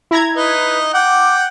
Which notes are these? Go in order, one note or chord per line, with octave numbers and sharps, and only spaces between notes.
E4 A#5 G#6
D#4 B4
F#5 G5 D6